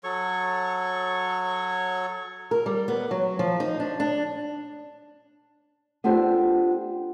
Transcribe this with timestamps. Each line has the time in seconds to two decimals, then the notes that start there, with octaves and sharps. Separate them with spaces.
0.04 F#3 A4 C#5 C#6
2.51 A#4
2.66 G3
2.88 B3
3.11 F#3
3.39 F3
3.60 D#4
3.80 D4
4.00 D4
6.04 B3 D4 F4 G4 A4 C5